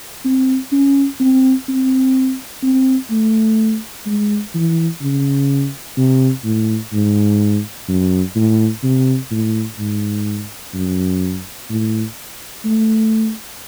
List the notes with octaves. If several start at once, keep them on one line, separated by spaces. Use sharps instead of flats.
C4
C#4
C4
C4
C4
A3
G#3
E3
C#3
C3
A2
G#2
F#2
A2
C3
A2
G#2
F#2
A2
A3